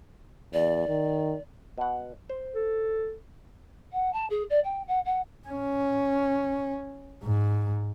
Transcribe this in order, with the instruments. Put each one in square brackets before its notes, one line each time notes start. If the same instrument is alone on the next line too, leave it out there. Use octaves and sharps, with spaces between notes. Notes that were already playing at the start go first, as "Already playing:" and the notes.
[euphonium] E2 [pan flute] D5
[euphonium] D#3
[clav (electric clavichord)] B2 F#5
C5
[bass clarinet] A4
[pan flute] F#5
A5
G#4
D5
G5
F#5
F#5
[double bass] C#4
G#2